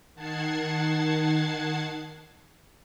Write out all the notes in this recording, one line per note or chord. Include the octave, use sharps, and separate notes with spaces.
D#3 F#5 A5 G#6 A6 C7